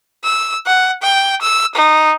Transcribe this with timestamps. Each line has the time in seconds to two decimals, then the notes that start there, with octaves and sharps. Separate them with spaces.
0.24 E6
0.66 F#5
1.02 G5
1.41 E6
1.75 D#4